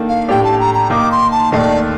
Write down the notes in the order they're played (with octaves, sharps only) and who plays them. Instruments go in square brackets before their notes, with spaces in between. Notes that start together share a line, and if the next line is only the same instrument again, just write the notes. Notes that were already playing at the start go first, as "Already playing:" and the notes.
Already playing: [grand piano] D#3 A#3 D4 A4
[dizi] F5
[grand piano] A2 A3 D4 G4 [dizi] G5
[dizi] A5
A#5
A#5
[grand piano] D#3 A#3 D#4 [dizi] D6
[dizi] C6
A5
[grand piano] D#2 D#3 A3 [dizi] D5 D#5